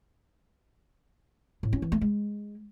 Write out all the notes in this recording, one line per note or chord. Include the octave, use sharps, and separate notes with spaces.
A2
C#4
E3
A3
G#3